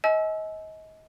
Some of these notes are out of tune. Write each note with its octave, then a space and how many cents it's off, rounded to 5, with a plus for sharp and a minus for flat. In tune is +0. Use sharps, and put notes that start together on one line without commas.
D#5 +30 G#5 +40 E6 +0